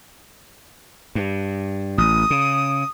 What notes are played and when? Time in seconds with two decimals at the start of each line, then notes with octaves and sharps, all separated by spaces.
1.15 G2
1.98 A1 D#6
2.30 C#3